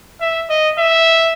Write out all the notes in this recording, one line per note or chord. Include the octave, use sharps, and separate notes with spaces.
E5
D#5
E5